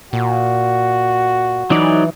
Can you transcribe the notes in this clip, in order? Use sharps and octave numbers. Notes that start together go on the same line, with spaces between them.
A#2 F#4
E3 F#3 D#4 D5